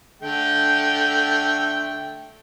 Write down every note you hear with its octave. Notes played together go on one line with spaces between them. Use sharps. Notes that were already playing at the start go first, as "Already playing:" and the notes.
D3 A3 G5